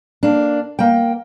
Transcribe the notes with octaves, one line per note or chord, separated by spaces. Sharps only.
A#3 D4
A#3 G5